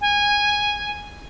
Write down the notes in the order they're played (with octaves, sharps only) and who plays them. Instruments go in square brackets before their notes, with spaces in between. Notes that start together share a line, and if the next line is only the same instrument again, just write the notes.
[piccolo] G#5